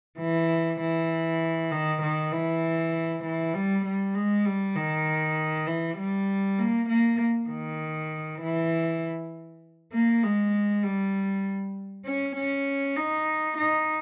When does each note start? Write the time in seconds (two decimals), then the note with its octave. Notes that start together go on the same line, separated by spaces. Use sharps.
0.19 E3
0.81 E3
1.72 D#3
2.02 D#3
2.32 E3
3.23 E3
3.54 G3
3.85 G3
4.15 G#3
4.45 G3
4.76 D#3
5.67 E3
5.98 G3
6.59 A#3
6.89 A#3
7.50 D#3
8.41 E3
9.93 A#3
10.24 G#3
10.84 G3
12.06 C#4
12.36 C#4
12.97 D#4
13.58 D#4